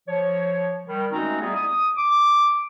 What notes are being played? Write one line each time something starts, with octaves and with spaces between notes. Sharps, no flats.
F3 C#5
D#3 G3
G#3 A3 C4 C#4 D#4 F#4
G3 A3 B3 E4 G#4
D#6
D6